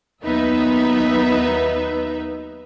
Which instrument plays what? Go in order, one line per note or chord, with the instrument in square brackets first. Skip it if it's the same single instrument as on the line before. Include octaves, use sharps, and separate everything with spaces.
[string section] D#2 F#3 B3 D#4 B4 E5